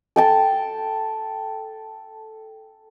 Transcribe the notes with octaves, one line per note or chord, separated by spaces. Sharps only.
A4 G5 A5